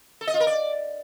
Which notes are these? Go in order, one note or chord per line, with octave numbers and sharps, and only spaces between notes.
A4
D#5
F4
A#4
D5